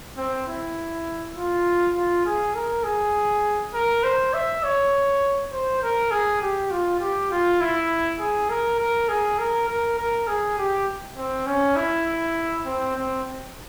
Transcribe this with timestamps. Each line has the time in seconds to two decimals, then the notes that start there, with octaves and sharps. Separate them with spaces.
0.17 C4
0.47 E4
1.36 F4
1.95 F4
2.25 G#4
2.55 A#4
2.84 G#4
3.74 A#4
4.04 C5
4.34 E5
4.64 C#5
5.52 C5
5.82 A#4
6.11 G#4
6.41 G4
6.71 F4
7.00 G4
7.31 F4
7.61 E4
8.19 G#4
8.50 A#4
8.79 A#4
9.09 G#4
9.39 A#4
9.69 A#4
9.98 A#4
10.27 G#4
10.58 G4
11.17 C4
11.47 C#4
11.76 E4
12.66 C4
12.95 C4